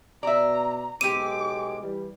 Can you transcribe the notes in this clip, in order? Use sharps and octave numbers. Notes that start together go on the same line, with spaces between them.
B2 D5 E5 A#5
B1 G#3 C4 G4 D6 D#7
E3 G3